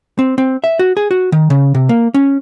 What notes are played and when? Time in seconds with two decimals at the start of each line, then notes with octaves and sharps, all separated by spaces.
0.19 C4
0.38 C4
0.64 E5
0.79 F#4
0.97 G#4
1.11 F#4
1.32 D#3
1.50 C#3
1.75 C3
1.89 A#3
2.14 C#4